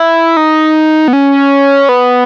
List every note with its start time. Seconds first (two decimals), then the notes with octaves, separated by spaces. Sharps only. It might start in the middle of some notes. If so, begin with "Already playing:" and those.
Already playing: E4
0.37 D#4
1.08 B3
1.13 C#4
1.89 B3